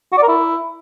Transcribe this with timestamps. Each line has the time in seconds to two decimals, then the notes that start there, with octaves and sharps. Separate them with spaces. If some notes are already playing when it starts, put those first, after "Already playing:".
0.12 F#4
0.17 D5
0.23 A#4
0.28 E4